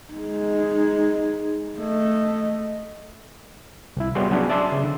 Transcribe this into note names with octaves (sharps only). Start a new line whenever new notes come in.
G#3 D#4
A3 D#5
C2 E4
G3 B3 F#4 G#4 C#5 C6
F#3 B3 C#4 D4 G#4
D5 E5 A5 C6
C#3
D3